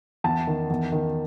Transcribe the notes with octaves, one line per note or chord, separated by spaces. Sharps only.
E2 A5
D#3
E2
D#3